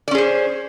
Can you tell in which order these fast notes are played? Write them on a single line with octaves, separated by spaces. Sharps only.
D5 C#4 G#4 C5